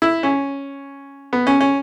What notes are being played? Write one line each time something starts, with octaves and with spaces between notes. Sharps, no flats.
E4
C#4
B3
C#4
C#4